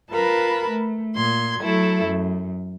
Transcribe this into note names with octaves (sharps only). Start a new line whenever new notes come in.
F4 A#4 B4 A5 B5
A3
A#2 C6 G#6
F#3 A3 E4 A4
F#2